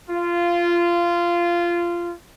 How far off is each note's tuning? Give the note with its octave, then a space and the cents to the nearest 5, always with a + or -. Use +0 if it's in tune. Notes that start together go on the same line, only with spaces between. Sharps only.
F4 -15